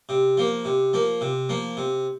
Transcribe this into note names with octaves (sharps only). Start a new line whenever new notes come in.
C3
F3 A#3
C3
F3 A#3
C3
F3 A#3
C3